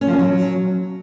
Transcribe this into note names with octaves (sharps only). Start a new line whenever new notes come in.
C#4
F3
C#4
F#3